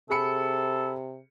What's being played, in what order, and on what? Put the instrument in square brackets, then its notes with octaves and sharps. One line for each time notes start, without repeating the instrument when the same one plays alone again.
[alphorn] C3 [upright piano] G#4 B5 C#7 [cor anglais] A4